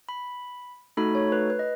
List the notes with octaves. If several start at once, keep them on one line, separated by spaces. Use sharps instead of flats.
B5
A3 D#4 F#4 A4 B5
C#5
B4
B4
D#5